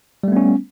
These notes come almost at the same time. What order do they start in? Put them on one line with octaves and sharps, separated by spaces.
G3 A3 B3 C#4